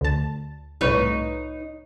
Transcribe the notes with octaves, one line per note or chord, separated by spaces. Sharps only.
D2 A5
C2 A2 D#4 B4 C#5